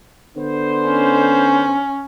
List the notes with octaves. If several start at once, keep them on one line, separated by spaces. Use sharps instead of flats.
D3 B3 C5
C#4